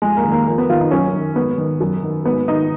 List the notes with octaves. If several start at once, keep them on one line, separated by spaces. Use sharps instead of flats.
F2 G#3
A#3
D#3
A#3
F2 A#3
B3
D#3 F4
D#4
F#2 C#4
D#3
G#2 B3
D#3
F#2
D#3
G#2 B3
D#3 D#4